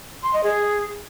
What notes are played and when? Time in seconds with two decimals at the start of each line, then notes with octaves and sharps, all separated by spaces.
0.23 C6
0.33 D#5
0.44 G#4